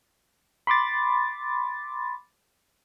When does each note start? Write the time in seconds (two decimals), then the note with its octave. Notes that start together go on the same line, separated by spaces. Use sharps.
0.67 B5 C6 D6 A6